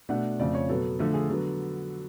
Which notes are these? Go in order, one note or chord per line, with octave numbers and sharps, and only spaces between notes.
B2 A3 D4 F#5
F2 C#3 F3 A3 D5
C#5
B2 F#3 B3 A4
D3 F3 A3 A4
G#4
D3 F#3 B3 A4